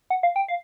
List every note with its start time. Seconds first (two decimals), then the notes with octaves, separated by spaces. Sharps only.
0.10 F#5
0.23 F5
0.36 G5
0.48 F5